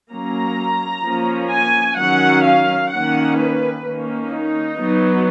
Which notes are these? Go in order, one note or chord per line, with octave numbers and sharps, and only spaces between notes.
F#3 A#3 C#4 A#5
F3 A#3 C#4
G#5
D#3 F#3 C#4 F#5
F5
D#3 A#3 C#4 F#5
B4
D#3 A#3 C#4
D#4
F#3 B3